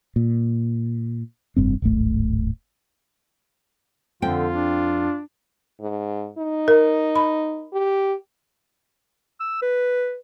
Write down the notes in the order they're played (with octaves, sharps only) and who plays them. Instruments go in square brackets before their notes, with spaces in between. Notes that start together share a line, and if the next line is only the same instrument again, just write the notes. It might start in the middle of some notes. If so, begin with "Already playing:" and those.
[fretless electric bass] A#2
F1 G2 C4
D1 G#1 A3
[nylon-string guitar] F2 C4 G5 [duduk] D3 [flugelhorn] F4
[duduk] D4
[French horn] G#2
D#4
[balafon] A#4
B5
[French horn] G4
[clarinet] E6
B4